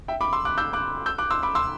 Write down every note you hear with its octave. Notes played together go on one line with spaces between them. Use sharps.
E5 G5
B5 D6
C6 E6
D6 F#6
E6 G6
D6 F#6
E6 G6
D6 F#6
C6 E6
B5 D6
C6 E6